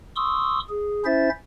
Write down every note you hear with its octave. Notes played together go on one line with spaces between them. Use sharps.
C6 C#6 D#6 E6
G#4
C#4 E4 C5 E5 A6